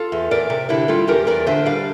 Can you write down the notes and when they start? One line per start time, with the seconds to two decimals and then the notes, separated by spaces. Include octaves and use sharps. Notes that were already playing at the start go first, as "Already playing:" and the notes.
Already playing: F4 A4
0.12 E2
0.31 E2 A#4 D5
0.50 C3
0.69 D3 E4 G4
0.88 G3 F4 A4
1.07 E2 G4 A#4
1.27 E2 A#4 D5
1.46 D3 C5 E5
1.66 G3 D5 F5